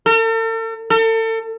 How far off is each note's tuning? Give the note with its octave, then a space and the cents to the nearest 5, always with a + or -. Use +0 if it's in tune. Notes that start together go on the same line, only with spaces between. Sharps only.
A4 +45
A4 +35